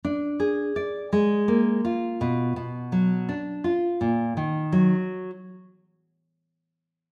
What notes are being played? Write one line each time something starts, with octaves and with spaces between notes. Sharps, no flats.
D4
G#4
D5
G#3
A#3
F4
B2
B2
F#3
D4
F4
A#2
D#3
F#3